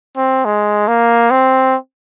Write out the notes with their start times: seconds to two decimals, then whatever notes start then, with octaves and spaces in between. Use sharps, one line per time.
0.17 C4
0.45 G#3
0.88 A#3
1.31 C4